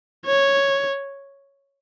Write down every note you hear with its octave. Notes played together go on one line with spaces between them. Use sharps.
C#5